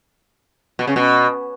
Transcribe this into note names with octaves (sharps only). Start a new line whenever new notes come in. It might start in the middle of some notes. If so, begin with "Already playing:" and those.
B2
C#3
B2